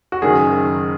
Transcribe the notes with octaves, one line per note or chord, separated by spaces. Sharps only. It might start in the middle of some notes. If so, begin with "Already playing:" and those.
F#4
F#1 F#2 D#3 G#4